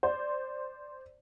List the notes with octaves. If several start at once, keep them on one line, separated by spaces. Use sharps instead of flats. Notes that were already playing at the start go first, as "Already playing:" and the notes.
C5 D5